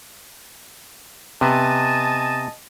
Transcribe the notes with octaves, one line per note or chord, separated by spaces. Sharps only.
C3 B3 D#5 G#5 A5